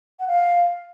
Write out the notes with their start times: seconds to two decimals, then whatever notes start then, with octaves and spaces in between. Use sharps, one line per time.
0.20 F#5
0.28 F5